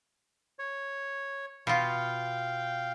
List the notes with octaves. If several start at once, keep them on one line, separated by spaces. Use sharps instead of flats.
C#5
B2 F4 F5 G5